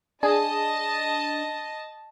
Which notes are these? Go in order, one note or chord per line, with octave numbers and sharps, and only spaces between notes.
D4 G#4 D#5 A5